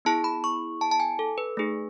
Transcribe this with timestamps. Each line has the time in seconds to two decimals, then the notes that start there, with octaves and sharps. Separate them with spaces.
0.05 B3 E4 G#4 A5
0.24 B5
0.44 C#6
0.81 A5
0.91 A5
1.00 G#5
1.19 A4
1.38 B4
1.57 A3 D#4 G#4